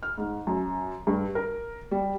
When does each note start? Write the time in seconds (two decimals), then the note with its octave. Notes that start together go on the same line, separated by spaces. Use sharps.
0.03 F6
0.18 G#2
0.47 F#2
1.07 G2
1.35 A#4
1.91 G3